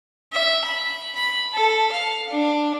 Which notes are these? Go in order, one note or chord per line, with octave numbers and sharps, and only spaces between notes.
E5
B5
B5
A4
F5
D4